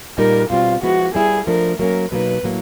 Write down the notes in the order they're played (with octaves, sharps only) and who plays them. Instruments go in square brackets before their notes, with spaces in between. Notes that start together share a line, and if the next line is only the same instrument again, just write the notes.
[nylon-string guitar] A#2 G3 A#3 D#4 [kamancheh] A#4
[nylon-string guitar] B2 G3 C4 [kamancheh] F4
[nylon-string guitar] F3 G#3 B3 E4 [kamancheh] F#4
[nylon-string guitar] G3 B3 E4 [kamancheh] G#4
[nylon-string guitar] F3 A3 D4 [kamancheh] A#4
[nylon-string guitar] F#3 A#3 C#4 [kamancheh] A#4
[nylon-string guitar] B2 F#3 A#3 D#4 [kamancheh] B4
[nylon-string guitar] A2 F#3 A#3